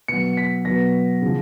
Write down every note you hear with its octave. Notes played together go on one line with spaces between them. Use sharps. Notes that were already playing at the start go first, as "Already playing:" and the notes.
B2 F#3 C#7
B6
B2 F#3 A#6
C#3 F3